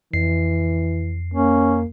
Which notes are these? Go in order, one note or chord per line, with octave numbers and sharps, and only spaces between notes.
F2 E3 C7
A#3 C#4